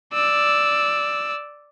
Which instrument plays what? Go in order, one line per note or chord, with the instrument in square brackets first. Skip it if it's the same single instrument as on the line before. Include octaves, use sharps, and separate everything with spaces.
[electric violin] D5 E6